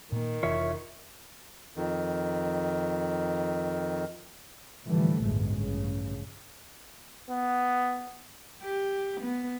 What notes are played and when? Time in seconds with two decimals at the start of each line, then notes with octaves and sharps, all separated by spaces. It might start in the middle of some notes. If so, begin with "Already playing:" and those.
0.12 A#2 D#3 A#3
0.43 F1 E3 F4 C#5 E5
1.76 F2 D#3
4.84 A2 D3 E3 F3 G3 A3
5.21 A1 D2 G2 B2 G#3
5.57 A1 G2 C#3
7.30 B3
8.63 G4
9.21 B3